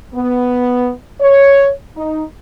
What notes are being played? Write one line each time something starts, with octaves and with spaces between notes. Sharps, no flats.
B3
C#5
D#4